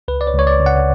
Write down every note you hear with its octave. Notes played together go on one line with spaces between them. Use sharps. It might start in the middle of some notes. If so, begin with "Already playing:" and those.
C#2 B4
D5
C#5
C#2
C#5
D5
C#3
F#5